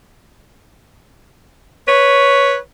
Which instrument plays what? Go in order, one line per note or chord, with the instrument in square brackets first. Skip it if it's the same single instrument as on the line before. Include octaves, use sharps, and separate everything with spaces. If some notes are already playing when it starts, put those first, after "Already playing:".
[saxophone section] B4 C#5